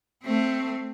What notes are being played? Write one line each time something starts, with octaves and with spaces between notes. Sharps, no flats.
A3 C4